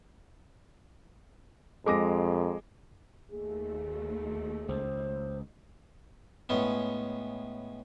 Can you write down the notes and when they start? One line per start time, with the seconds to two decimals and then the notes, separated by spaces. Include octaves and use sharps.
1.86 F2 G#3 D6 A#6
3.32 D#2 A3 G#4
4.69 C#2 C5
6.49 A2 G#3 B3 C#4